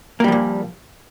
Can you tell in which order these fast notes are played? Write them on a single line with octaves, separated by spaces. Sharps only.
A#3 G3 F3 A#2